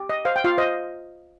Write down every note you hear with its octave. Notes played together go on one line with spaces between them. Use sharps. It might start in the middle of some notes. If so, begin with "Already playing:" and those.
Already playing: G4
D#5
C5 F5
G5
F4 F5
C5 D#5